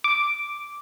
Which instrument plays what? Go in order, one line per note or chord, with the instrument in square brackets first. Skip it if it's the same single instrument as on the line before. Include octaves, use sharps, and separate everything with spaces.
[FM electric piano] D6